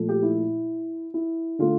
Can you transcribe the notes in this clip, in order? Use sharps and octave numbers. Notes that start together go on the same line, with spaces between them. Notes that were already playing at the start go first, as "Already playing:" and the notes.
Already playing: A#2 F3 A3
G4
E4
E4
D3 A3 F4